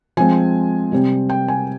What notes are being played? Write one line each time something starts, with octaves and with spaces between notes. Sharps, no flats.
F3 G#3 C4 G#5
C3 G3 C4
G5
G#5